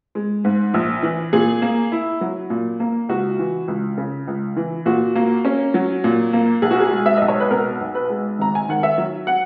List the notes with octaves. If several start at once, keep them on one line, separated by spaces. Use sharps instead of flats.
G#3
G#2
A#1
E3
A#2 G#4
A#3
E4
F#3
A#2
A#3
C#2 F#4
E3
C#2
C#3
C#2
E3
A#2 F#4
A#3
C#4
F#3
A#2
A#3
B1 G#4
F#4
G#4
G#3
E5
B1 D#5
C#5
B4
B2 A#4
B1
B4
G#3
G#1 A#5
G#5
D#3 F#5
E5
F#3
F#5